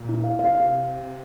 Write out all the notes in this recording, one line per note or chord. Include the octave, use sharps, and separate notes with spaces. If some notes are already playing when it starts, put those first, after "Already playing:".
Already playing: A#2
E4
F5
C3 F5
F5